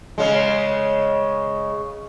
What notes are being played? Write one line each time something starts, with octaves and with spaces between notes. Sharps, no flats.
C#3 G#3